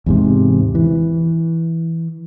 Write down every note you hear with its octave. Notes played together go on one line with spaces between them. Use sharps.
E2 G#2 C3
E3